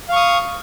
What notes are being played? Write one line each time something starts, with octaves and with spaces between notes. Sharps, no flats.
F5 C#6 D#6